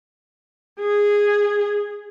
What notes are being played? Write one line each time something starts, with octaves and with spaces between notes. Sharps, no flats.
G#4